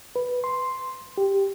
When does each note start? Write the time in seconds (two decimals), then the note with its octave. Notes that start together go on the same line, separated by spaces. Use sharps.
0.16 B4
0.44 C6
1.18 G4